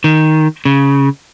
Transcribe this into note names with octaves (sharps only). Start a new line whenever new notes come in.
D#3
C#3